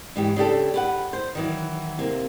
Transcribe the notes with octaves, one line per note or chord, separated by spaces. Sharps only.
G#2 E3 G4
C#3 D4 G4 A4
G4 B4 F#5
C5
D#3 E3 F#3
C3 A#3